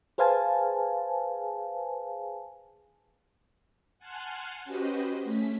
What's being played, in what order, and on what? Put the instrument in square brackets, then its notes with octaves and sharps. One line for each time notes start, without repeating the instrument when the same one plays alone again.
[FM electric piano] G#4 B4 C5 F5 G#5 A5
[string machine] F#5 G#5 A5 C6 F6 F#6
C#4 F#4 G4 B4 C5 D#5
A3 C#4 B6